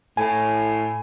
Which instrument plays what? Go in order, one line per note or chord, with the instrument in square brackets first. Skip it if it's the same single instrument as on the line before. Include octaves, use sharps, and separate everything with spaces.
[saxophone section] A2 [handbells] G#5